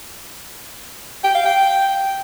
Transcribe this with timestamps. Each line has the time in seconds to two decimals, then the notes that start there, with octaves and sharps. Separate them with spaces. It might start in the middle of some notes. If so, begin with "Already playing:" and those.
1.24 G5
1.35 F5
1.46 G5